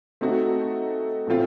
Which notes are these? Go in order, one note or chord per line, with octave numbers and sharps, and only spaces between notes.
A3 C4 D#4 F#4
A2 F3 A3 C4 F4